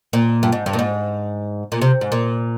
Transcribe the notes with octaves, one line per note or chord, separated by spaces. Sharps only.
A#2
G2
G#2
G2
A#2
G#2
A#2
C3
G#2
A#2